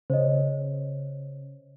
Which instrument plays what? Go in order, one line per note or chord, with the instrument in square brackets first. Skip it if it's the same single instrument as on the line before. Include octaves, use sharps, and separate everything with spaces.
[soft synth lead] C#3 [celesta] C5 C#5 D#5